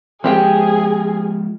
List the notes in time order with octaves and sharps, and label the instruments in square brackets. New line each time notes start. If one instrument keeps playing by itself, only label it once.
[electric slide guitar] F3 G#3 [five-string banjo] C4 G4 G5 [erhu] G#4